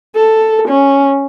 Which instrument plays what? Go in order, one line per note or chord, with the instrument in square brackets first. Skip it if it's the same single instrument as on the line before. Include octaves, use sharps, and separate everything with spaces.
[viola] A4
C#4